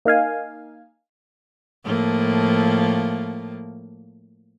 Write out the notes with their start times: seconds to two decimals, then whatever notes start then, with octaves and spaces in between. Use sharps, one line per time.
0.05 A#3 D#4 F5 G#5
1.84 A2 F3 A#3